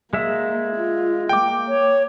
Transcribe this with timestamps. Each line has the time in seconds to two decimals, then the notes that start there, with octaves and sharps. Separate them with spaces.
0.13 G#3 A#3 E5
0.75 F4
1.29 A#3 G5 D6
1.68 C#5